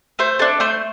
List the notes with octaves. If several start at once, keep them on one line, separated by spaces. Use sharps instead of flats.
A3 C5
D4 A4
A3 C5